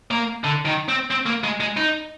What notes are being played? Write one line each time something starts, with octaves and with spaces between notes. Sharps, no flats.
A#3
D3
D#3
C4
C4
A#3
G#3
G#3
D#4